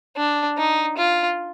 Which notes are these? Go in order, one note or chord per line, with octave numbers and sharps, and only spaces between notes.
D4
D#4
F4